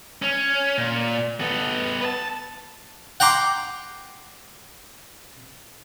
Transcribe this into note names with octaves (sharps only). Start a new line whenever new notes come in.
C#4
A#2
B3 A4
B4 A5
F#5 G5 A#5 C6 D6